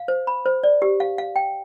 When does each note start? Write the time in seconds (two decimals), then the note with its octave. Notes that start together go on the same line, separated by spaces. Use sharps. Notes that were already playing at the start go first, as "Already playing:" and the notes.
Already playing: F5
0.08 C5
0.27 B5
0.46 C5
0.64 D5
0.82 G4
1.00 F5
1.18 F5
1.36 G5